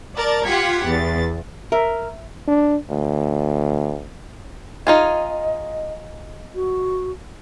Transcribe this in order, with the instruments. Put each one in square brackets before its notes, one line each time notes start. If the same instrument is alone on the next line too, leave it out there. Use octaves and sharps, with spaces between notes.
[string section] A#4 D5 A5 A6
F4 G4 F#5 G#6 B6 C#7
E2 A6
[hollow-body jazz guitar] A#4 [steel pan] E5
[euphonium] D4
D2
[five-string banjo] D#4 F4 G#4 [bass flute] D#5
[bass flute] F#4